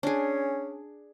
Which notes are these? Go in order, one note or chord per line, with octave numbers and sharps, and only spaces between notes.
C#4 D4 G#4